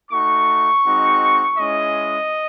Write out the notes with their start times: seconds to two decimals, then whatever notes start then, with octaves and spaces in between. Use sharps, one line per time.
0.11 A3 D#4 F#4 C#6
0.85 G#3 C4 D#4 F#4
1.58 G#3 C#4 E4 D#5